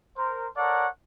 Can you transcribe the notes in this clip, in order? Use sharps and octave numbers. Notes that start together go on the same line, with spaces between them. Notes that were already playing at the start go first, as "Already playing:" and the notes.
A#4 C5
A4 A#4 C#5 D5 F#5